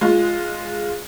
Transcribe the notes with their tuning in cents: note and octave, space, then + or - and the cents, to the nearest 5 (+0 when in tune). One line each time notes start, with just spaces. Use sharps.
G#3 +0 F4 +0